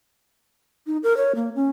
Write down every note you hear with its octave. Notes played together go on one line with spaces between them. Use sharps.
D#4
A#4
C#5
A#3
C#4